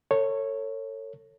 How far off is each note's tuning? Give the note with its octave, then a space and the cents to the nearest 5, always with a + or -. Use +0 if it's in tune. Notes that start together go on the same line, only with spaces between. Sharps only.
A4 +35 C#5 -10